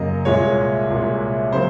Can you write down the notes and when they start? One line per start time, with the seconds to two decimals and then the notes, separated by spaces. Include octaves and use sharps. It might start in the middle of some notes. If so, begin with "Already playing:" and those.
Already playing: F#2 C#3 F#3 A#3 D#5
0.25 C2 A#2 G#3 C#5
0.90 C2 A#2 G#3
1.53 C#3 F#3 A#3 C5